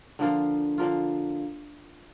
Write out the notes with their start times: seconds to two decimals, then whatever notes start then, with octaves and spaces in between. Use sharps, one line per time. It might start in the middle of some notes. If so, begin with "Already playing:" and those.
0.19 D3 F3 A#3 F4
0.78 D3 F3 A#3 F4